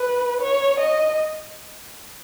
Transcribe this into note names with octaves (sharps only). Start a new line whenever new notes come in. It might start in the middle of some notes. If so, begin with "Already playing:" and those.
Already playing: B4
C#5
D#5